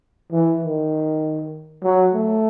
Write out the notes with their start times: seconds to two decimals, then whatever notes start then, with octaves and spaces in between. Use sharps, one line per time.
0.32 E3
0.63 D#3
1.84 F#3
2.14 A3